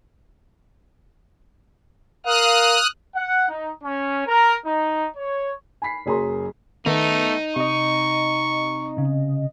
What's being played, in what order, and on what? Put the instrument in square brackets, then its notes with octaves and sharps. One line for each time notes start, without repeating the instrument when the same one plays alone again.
[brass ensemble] A#4 F5 [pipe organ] D#6 F6 F#6
[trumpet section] F#5
D#4
C#4
A#4
D#4
C#5
[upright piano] G#5 B5 B6 C7
F#1 F#2 G#4 C#5 A#5 C6
[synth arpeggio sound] D#3 B3 [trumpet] A3 [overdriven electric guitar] D#4
[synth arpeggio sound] C3 D#5 [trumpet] C#6
[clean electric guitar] C#3